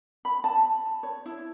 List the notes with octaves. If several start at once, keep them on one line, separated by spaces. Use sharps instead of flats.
B5
A5
C#5
E4